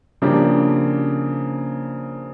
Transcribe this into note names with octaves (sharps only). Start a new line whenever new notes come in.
C#3 F3 A#3 D4 G4